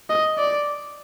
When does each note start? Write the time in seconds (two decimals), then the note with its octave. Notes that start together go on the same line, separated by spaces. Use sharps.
0.10 D#5
0.38 D5